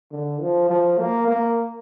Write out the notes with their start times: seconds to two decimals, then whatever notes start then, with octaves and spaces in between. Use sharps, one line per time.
0.12 D3
0.41 F3
0.70 F3
0.99 A#3
1.28 A#3